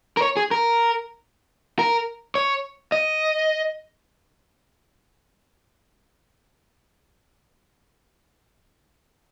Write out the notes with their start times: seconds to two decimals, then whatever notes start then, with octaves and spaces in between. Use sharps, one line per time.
0.17 A#4
0.22 C#5
0.37 G#4
0.51 A#4
1.79 A#4
2.35 C#5
2.92 D#5